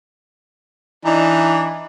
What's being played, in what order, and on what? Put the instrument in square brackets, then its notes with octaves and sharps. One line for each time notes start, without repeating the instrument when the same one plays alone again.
[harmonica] E3 D4 D#4